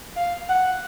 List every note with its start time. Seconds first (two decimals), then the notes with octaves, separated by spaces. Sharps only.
0.16 F5
0.48 F#5